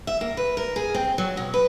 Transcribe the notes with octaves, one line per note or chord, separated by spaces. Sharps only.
E5
A#3
B4
A#4
G#4
C4
F#3
B2
B4